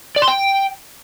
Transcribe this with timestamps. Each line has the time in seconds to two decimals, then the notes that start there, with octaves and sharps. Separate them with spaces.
0.16 D5
0.22 C6
0.28 G5